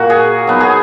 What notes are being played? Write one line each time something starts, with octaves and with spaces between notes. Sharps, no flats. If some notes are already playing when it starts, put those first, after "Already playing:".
Already playing: A#2 A#3 F#4
G#4
F#3 B3 D#4
G#4